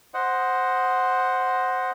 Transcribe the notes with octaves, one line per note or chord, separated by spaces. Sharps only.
C5 D#5 F#5